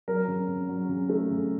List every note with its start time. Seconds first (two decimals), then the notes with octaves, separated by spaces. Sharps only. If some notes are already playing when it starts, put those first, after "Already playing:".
0.08 F#3 A#4
0.28 C#3
0.48 C#3
0.69 F#3
0.89 C#3
1.09 A3
1.31 C#3